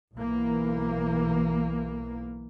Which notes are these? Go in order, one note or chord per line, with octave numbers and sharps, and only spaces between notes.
B1 E3 A#3